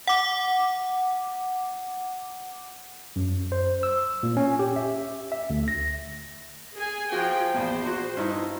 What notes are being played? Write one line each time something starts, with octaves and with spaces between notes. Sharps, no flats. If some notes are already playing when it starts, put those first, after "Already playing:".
F#5 D6
F#2
C5
E6
A#2
C#4
G4
E5
E5
D2
A#6
G#4 G#5
F3 F#4 G#4 G5
A#1 E2 C5
F#4
G2 D#4 E4